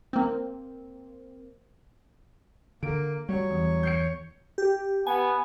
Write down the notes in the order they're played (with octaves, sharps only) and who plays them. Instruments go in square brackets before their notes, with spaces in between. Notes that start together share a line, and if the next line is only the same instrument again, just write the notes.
[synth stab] A#3 C4
[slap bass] D3 [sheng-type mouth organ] A#3 [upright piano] D7
[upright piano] F#3 [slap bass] G3 [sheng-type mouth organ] C#5
[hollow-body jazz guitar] E2
[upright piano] G6 C7 C#7
[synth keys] G4
[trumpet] B3 [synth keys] G#5